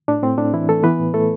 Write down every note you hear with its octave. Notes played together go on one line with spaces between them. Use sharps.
A2 D4
A2 C4
A2 D4
E3 E4
E3 A3 A4
E3 B3 B4
A2
A2 A3 A4